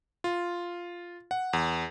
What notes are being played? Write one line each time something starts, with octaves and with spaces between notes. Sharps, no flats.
F4
F#5
E2